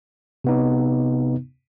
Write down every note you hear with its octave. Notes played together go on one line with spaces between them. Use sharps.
C3 B3 D#4